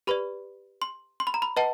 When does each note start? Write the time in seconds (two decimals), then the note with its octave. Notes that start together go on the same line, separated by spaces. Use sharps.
0.07 G4 B4 D5 B5
0.82 C6
1.20 C6
1.27 B5
1.34 A#5
1.42 B5
1.57 B4 D#5 F#5 A5